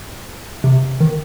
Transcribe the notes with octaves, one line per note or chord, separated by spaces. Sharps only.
C3
D#3